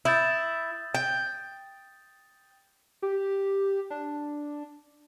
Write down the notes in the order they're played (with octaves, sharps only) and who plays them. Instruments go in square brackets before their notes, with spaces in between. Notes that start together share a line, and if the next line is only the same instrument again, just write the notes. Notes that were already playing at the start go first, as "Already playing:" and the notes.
[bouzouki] E4 [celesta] D#6 G6 A6
[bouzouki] G5
[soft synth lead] G4
D4